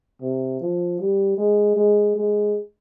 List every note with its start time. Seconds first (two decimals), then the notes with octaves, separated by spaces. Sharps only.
0.22 C3
0.61 F3
1.00 G3
1.38 G#3
1.76 G#3
2.16 G#3